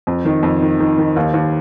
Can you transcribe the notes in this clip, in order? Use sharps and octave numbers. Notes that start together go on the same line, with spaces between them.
F2
D#3
F2
D#3
D#3
D#3
D#2
D#2